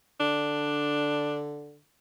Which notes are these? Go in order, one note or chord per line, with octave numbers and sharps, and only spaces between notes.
D3 D4